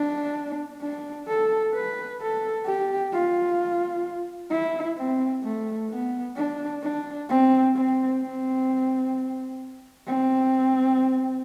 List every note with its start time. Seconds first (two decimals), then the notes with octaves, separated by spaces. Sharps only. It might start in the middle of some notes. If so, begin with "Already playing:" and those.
Already playing: D4
0.81 D4
1.28 A4
1.74 B4
2.20 A4
2.66 G4
3.13 F4
4.51 E4
4.97 C4
5.44 A3
5.89 B3
6.36 D4
6.83 D4
7.29 C4
7.75 C4
8.22 C4
10.07 C4